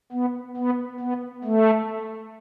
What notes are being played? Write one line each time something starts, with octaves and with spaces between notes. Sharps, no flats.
B3
B3
B3
A3